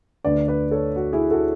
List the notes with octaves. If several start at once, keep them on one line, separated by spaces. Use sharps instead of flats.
D2 D3 B4 D5
B4 D5
A4 C#5
F#4
E4 G#4
F#4 A4